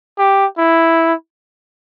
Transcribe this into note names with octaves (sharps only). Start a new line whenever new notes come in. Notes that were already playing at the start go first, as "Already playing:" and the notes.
G4
E4